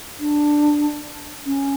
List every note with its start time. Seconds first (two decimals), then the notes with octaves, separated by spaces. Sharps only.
0.19 D4
1.46 C#4